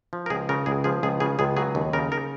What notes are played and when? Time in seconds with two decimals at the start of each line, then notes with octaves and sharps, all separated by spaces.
0.13 F3
0.26 A#4
0.30 C#2 G#4
0.49 C#3 A#4
0.66 C#2 G#4
0.84 F3 G#4
1.03 C#2 G#4
1.20 C#3 G#4
1.39 C#2 G#4
1.57 F#3 G#4
1.75 D#2
1.93 C#3 A#4
2.12 A#4